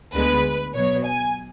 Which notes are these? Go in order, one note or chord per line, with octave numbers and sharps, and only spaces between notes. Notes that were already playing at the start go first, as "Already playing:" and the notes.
D2 D3 G#3 B3 B4
B2 F#3 B3 C#5
G#5